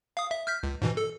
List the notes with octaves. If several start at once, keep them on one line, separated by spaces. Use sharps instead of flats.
F5 D#6
E5
F6 G6 B6
C#2
G#2 B2 E3
A4